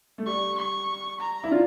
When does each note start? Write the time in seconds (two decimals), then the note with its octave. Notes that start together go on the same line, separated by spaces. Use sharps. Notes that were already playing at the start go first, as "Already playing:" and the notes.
0.18 A3
0.26 G3 C#6
0.58 C#6
1.20 A#5
1.44 E4
1.51 D4 F4